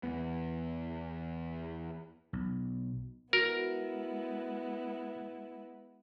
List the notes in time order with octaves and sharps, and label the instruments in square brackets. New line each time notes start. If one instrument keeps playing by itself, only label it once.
[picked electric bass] E2 B3
[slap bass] B1
[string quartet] G#3 B3 E4 [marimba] F#4 [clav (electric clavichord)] A#4